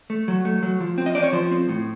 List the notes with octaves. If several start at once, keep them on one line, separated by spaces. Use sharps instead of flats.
A3
F#3
A3
F#3
F3
C4
D#5
C4 D5
C#5
F3 C5
C4
A2